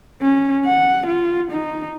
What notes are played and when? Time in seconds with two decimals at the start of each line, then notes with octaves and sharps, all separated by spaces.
0.21 C#4
0.66 F#5
1.07 F4
1.52 D#4